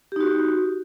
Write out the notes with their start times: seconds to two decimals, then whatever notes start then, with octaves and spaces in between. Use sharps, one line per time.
0.12 G4
0.16 D#4
0.20 F#4